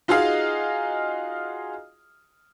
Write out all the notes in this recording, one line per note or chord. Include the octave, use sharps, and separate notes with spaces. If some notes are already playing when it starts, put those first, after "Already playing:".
D#4 F4 F#4 G#4 D#5 F5